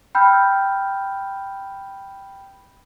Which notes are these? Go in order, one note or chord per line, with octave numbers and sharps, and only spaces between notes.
G5 B5 E6 F6 G6